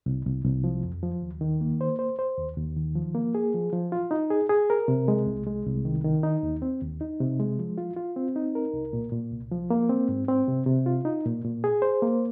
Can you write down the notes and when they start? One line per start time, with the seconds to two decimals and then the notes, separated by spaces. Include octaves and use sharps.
0.06 C2
0.25 C2
0.45 C2
0.64 F3
0.84 F2
1.03 F3
1.22 D#2
1.41 D#3
1.61 A#3
1.81 C5
1.99 C5
2.19 C5
2.38 D#2
2.57 D#2
2.76 D#3
2.95 F3
3.15 A#3
3.35 G#4
3.54 F3
3.73 F3
3.92 F4
4.11 D#4
4.30 G#4
4.49 G#4
4.70 A#4
4.88 C3
5.08 G#3
5.26 C2
5.46 G#3
5.66 C2
5.85 D#3
6.04 D#3
6.23 D#4
6.43 D#2
6.62 C4
6.81 D#2
7.01 D#4
7.20 C3
7.39 G#3
7.59 F3
7.78 F4
7.96 F4
8.16 C4
8.36 D#4
8.55 A#4
8.73 C2
8.93 A#2
9.12 A#2
9.32 C2
9.51 F3
9.70 A#3
9.89 C4
10.09 G#2
10.28 C4
10.48 C3
10.66 C3
10.86 F4
11.05 D#4
11.25 A#2
11.45 A#2
11.64 G#4
11.82 C5
12.02 A#3